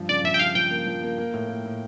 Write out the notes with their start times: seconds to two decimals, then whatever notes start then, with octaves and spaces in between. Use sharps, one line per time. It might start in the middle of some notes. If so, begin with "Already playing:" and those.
Already playing: G2 F3
0.09 C#3 D5
0.24 F3 E5
0.34 G5
0.39 C#3 F5
0.55 F3 G5
0.71 A#3
0.87 F3
1.03 A#3
1.18 A#3
1.34 A2
1.49 A#3
1.65 A2